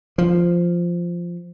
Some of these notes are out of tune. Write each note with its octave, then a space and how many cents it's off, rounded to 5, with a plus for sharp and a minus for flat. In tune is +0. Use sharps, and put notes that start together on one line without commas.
F3 -5